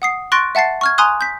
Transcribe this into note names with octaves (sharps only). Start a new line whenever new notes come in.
F#5 D#6 C7
C6 C#6 F#6 A6 A#6 D7
E5 F#5 A5 A6 C7
C#6 F6 G#6
G#5 A#5 C6 D#6 F#6
G6 B6